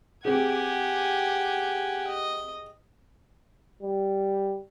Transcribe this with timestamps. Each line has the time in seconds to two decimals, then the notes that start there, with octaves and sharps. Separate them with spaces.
0.25 C4 G4 G#4 F#5 G#5
2.08 D#5
3.83 G3